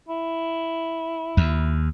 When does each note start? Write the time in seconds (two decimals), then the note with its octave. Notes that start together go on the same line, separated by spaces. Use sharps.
0.09 E4
1.37 D#2